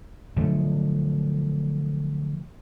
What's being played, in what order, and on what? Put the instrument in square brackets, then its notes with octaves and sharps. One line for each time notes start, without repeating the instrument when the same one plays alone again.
[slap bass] D3 F3 F#3 A3